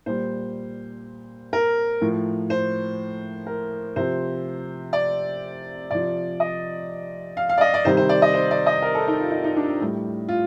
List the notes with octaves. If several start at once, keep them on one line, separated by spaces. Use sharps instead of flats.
A#2 G3 C5
A#4
A2 F3
C5
A#4
C3 F3 C5
D5
C3 F3 D5
D#5
F5
F5
D5
D#5
D5
C3 D#3 G3 C5
C5
D5
D#5
C5
D5
D#5
A#4
A4
D#4
F4
D#4
D#4
D4
A2 G3
F4